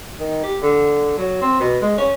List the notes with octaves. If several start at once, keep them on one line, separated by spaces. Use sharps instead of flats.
D#3
G4
D3
F#3
C4
B2
G#3
C#4